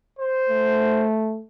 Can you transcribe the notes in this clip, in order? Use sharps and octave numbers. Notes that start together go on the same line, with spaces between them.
C5
A3